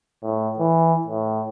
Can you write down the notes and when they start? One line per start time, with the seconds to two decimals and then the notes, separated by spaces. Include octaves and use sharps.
0.22 A2
0.59 E3
1.07 A2